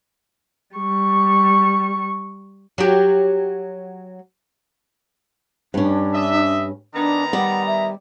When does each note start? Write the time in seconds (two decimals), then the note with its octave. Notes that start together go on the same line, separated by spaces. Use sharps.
0.76 G3 C#6
2.78 F#3 G4
5.74 G2 C#4 D4
6.14 D#5 E5
6.95 D#3 B3 D4 A#5
7.33 G3 D5 F#5
7.66 E5